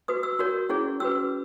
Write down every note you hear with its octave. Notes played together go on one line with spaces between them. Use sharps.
F#4 B4 D#6
E6
F#4 A#4 C#5
C#4 E4 G#4 C#5
C#4 F#4 B4 E6